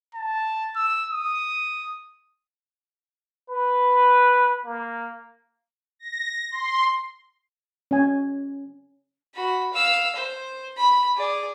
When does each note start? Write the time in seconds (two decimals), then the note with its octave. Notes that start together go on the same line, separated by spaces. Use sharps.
0.15 A5
0.76 E6
1.10 D#6
3.49 B4
4.65 A#3
5.99 A#6
6.51 C6
7.91 C#4 G#5
9.34 F#4 B5
9.73 F5 E6
10.16 C5
10.77 B5
11.17 G#4 D5